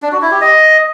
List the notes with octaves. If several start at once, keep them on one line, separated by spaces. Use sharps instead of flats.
D4
F#4
E4
G4
D#5